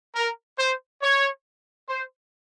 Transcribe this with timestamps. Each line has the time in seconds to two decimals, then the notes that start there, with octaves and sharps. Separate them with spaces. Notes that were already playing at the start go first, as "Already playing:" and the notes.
0.15 A#4
0.59 C5
1.02 C#5
1.89 C5